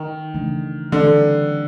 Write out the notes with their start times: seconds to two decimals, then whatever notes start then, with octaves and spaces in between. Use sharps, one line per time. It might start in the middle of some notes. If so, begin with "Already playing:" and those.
Already playing: D#3
0.34 C#3 E3 A3 D4
0.92 D3 E3 G3 C4